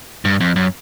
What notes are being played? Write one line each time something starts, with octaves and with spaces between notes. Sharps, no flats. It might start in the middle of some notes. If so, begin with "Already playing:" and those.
G2
F2
F#2